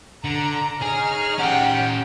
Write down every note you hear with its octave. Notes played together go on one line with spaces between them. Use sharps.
D3 A#5
D#4 G#4 C#5 F6
C#4 G4 F#5 G5